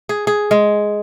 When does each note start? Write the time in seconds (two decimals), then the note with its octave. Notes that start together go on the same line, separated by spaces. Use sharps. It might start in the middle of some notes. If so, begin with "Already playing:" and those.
0.09 G#4
0.27 G#4
0.51 G#3